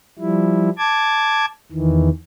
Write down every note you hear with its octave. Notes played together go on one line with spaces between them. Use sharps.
F3 G3 E4
A5 D6 G#6
E2 D#3 E3